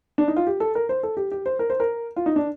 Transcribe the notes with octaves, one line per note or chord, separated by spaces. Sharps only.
D4
D#4
F4
G4
A4
A#4
C5
A4
G4
G4
C5
A#4
C5
A#4
F4
D#4
D4